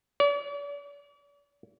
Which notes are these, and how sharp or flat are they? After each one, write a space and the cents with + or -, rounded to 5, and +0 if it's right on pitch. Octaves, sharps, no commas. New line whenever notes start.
D5 -45